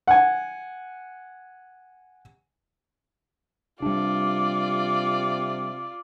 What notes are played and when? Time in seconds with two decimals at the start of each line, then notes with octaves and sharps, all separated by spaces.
0.08 F#5 G#5
3.82 C3 G3 D4 F4 D5